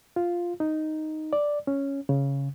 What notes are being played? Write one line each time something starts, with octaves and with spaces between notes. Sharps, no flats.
F4
D#4
D5
C#4
C#3